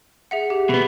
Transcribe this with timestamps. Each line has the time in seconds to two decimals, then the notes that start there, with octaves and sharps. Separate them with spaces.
0.31 G#4 E5 F#5
0.50 G4
0.69 B2 B3